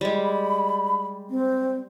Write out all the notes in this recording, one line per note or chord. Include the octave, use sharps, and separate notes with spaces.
G3 G#3 B5
C4